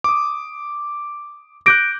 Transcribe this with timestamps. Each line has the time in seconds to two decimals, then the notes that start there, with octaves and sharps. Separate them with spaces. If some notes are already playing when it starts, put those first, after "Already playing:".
0.04 D6 D#6
1.66 D6 F#6 G6 A#6 D7